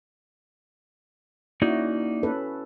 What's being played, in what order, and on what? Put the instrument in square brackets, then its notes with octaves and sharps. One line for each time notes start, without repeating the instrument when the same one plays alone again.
[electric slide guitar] A#3 D#4 D5 [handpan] C#4 E4 F#4
[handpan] C#4 A4 B4